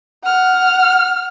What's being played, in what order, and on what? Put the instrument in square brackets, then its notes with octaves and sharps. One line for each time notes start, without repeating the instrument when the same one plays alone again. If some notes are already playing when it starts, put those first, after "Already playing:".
[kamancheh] F#5 F6